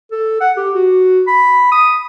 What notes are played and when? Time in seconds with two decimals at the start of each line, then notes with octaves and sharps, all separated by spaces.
0.12 A4
0.41 F#5
0.57 G4
0.75 F#4
1.27 B5
1.72 D#6